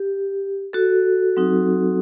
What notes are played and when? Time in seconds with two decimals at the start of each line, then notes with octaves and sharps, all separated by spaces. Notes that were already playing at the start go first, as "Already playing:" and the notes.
Already playing: G4
0.73 F#4 A4
1.36 F#3 C4 D#4 F#4